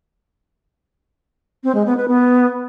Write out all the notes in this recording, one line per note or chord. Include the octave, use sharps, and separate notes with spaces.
C4
G#3
B3
B4
B3